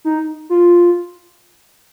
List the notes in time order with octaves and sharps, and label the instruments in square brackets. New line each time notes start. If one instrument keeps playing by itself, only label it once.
[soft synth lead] D#4
F4